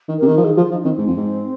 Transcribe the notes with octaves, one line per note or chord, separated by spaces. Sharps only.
D#3
C3 A#4
D#3
F3
D#3 G#4
F3 F4
F3 D#4
D#4
D#3 C4
G#2
F2
G#2